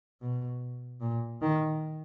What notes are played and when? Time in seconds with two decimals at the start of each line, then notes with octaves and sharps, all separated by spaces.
0.21 B2
1.01 A#2
1.42 D#3